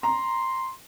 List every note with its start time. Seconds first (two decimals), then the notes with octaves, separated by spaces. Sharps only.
0.03 A#5 C6